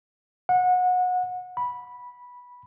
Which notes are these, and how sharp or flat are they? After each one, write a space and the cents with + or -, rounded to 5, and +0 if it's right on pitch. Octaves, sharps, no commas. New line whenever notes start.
F#5 -25
B5 -10